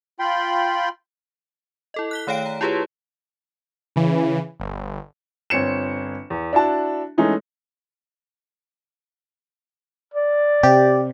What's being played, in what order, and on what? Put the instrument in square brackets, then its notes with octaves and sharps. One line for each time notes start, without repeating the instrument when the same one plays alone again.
[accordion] F4 G5 B5 C6
[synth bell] E4 A4 D#5
F#6 B6 G7
D#3 A3 C#5 F5 G5 D7
A#5
E4 F4 G4 G#4 B4 C#5
[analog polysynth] C#3 E3
G1
[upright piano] G1 C4 C#5 C#7 E7
E2
D4 E4 F#4 A5
E3 G#3 A3 C#4 D#4 E4
[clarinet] D5
[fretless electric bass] C3 [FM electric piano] G4